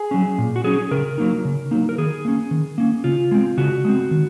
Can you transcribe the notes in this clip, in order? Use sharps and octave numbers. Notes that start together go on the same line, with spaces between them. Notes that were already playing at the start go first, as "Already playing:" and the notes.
Already playing: G#4
F#3 C#4
A#2
F#4
F#3 C#4 G#4
C#3 A#4
F#3 A#3 D#4
C#3
F#3 A#3 D#4
A#4
D#3 G#4
A#3 C#4
D#3
A#3 C#4
C#3 F4
G#3 C4
C#3 F#4
G#3 C4
D#3